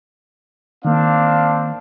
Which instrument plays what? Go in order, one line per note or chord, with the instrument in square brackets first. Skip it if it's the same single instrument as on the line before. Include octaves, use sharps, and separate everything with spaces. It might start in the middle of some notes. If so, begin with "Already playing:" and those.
[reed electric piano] D#3 A#3 [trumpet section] C4 D4 F5